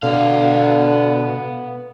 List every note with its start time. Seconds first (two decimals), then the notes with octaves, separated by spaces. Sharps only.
0.03 B2 D3 B3 F5